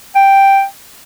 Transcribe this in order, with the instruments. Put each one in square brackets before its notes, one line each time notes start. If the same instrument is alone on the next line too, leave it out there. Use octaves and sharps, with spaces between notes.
[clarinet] G5